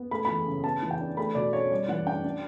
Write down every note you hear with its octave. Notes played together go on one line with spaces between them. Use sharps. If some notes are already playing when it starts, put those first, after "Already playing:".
Already playing: B3
A3 B5
E3 B5
C#3
B3 A5
E3
G5
D4
A3 B5
B2 D5
C#4 C#5
G3 D5
E3 F#5
D4 G5
D4